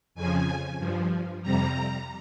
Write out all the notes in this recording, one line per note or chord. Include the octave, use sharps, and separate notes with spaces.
F2 C#3 F3 G#5
G2 F3
F2 C3 G3 A#5